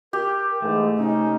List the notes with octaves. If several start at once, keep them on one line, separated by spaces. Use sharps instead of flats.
G4 A#4
G#2 E3 G#3 A3 A4
C3 C#4 D#4